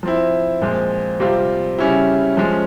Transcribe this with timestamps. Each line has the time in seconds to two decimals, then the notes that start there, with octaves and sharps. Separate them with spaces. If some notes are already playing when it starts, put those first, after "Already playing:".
0.03 F3 C4 E4
0.61 A#2 F3 G#3 C4
1.20 C3 G3 C4 F4
1.79 C#3 G3 C#4 E4
2.37 F3 G#3 C#4